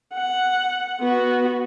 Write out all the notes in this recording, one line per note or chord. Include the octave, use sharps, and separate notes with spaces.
F#5
B3 F#4